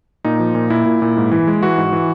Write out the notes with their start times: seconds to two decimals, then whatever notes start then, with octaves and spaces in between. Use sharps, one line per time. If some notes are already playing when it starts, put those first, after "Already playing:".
0.25 A#2 D#4
0.39 F3
0.55 A#2
0.70 A#2 E4
0.85 A#2
1.02 A#2
1.17 G#2
1.31 E3
1.47 G#3
1.63 E3 F#4
1.78 G#2
1.93 E3